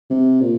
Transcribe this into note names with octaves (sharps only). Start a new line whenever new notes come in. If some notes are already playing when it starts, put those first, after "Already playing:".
C3
A#2